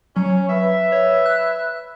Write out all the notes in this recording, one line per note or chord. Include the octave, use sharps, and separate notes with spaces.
F#3 C#4
B4 E5
C#5
F#6